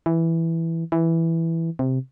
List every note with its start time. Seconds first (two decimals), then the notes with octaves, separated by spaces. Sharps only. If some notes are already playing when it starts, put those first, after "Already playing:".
0.06 E3
0.92 E3
1.79 C3